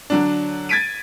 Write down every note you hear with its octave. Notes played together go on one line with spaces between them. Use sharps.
D3 F#3 D4
G#6 A6 B6 D7 D#7